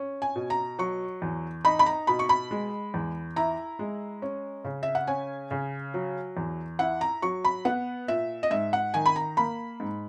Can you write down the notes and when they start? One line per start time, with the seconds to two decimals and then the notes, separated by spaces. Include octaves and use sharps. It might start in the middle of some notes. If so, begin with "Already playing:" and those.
Already playing: C#4
0.22 G#5
0.36 B2
0.50 A#5
0.79 F#3 C#6
1.22 E2
1.64 D#4 B5
1.79 B5
1.86 A#5
2.07 B2 B5
2.19 C#6
2.29 B5
2.51 G#3
2.94 E2
3.36 E4 A#5
3.79 G#3
4.22 C#4
4.64 C#3
4.83 E5
4.95 F#5
5.07 C#4 G#5
5.51 C#3
5.94 F#3
6.37 E2
6.79 E4 F#5
7.01 A#5
7.22 F#3 C#6
7.45 B5
7.65 B3 F#5
8.08 A#2 E5
8.43 D#5
8.51 G#2 E5
8.73 F#5
8.94 D#3 G#5
9.06 B5
9.16 A#5
9.37 A#3 B5
9.80 G#2